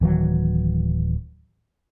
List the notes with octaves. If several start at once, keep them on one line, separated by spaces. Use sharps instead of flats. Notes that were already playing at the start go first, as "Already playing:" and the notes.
D1 D#3 E3 F#3